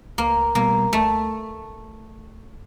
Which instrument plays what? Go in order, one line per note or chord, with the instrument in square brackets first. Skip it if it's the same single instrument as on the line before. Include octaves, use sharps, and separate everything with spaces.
[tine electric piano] C#2 [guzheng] A#3
[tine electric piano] B2 G3 B3 [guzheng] A#3
[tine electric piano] C#2 [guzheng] A3